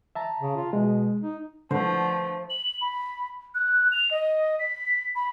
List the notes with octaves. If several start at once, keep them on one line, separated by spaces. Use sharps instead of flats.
E5 A5 A#5
C#3
F4
B2 G#3
D#4
D3 F3 A3 C5
F#7
B5
F#6
F7
D#5
B6
B5